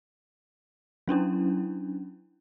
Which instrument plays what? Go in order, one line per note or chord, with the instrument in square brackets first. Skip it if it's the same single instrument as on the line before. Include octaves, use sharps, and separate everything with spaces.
[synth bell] F#3 C#4 D4 E4